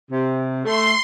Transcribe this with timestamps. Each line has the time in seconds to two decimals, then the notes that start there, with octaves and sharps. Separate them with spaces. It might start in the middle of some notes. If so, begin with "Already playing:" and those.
0.11 C3
0.65 A3 C6